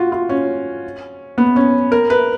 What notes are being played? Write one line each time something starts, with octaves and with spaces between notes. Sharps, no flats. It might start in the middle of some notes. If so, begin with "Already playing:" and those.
Already playing: F4 F#4
F4
C#4
B3
C#4
A#4
B4